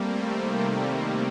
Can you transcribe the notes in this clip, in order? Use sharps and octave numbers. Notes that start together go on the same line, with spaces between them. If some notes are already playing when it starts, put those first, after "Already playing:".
Already playing: G3 A3 A#3 C4
C3 D#3